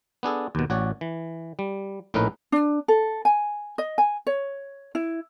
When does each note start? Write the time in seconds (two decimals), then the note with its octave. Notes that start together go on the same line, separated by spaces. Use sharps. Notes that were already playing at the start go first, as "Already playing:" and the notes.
0.23 B3 D4 G#4 A4
0.55 D#2 B2
0.70 A1 F#4 C#5 D5
1.01 E3
1.59 G3
2.14 A#1 A2 C#4 D#4 A#4 B4
2.52 D4
2.88 A4
3.25 G#5
3.78 D#5
3.98 G#5
4.27 C#5
4.95 E4